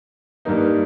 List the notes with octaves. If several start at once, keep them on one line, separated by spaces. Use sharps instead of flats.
G2 G3 A#3 D#4